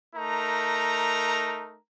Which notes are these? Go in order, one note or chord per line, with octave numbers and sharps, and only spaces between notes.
A3 D#4 A#4 A#5